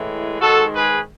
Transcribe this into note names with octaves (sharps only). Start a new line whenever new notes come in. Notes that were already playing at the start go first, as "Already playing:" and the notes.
Already playing: A2 E3 G#3
G#2 D#3 G#3 F#4 A4
G#4 B4